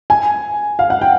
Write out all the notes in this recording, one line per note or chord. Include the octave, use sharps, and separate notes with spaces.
G#5
F5
F#5
G5